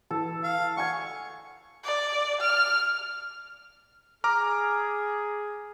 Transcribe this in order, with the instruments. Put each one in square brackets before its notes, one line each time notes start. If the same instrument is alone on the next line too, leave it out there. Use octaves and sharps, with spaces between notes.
[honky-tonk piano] E3 [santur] A4
[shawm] F5
[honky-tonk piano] F#5 G#5 G#6 [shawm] C#6
[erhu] D5
F6
[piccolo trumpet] G#4 [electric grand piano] A#5 D6 F6